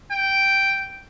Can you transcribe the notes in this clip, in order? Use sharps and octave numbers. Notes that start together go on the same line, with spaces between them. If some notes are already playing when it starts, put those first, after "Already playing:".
G5